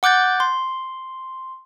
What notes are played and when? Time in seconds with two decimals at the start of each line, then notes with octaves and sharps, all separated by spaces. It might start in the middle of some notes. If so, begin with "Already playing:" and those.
0.03 F#5 D6 F#6 G6 A6
0.40 C6